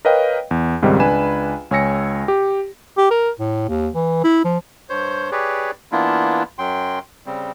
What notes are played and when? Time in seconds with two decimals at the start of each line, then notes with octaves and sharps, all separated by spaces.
0.05 A#4 B4 C#5 D#5 F5 G5
0.51 E2
0.82 C#2 G#2 D#3 G3 C4
1.00 C#2 D4 B4 G#5 B5 E7
1.71 C#2 C#5 G#5 E6 A#6 C#7
2.28 G4
2.98 G4
3.11 A#4
3.39 A2
3.69 D#2
3.95 E3
4.24 E4
4.45 F3
4.90 G2 C5 C#5 G6
5.32 G4 G#4 B4 C#5 D5
5.92 E3 A#3 B3 D4 E4 F4
6.59 F#2 F#3 G5 C6
7.26 C#3 G3 C4